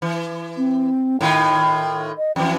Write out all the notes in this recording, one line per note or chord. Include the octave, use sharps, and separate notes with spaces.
E3
C4
A2 D#3 F4 G5
D#5
F2 E3 G5